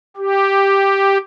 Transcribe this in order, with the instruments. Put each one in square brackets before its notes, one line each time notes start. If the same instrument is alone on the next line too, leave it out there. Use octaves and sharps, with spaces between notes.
[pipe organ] G4